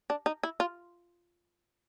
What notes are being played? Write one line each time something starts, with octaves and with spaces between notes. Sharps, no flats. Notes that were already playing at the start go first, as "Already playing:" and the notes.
D4
D#4
E4
F4